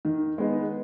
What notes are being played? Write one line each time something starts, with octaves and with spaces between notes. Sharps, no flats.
D#3
G#3 B3 D#4